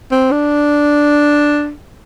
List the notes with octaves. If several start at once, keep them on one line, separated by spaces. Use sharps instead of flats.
C4
D4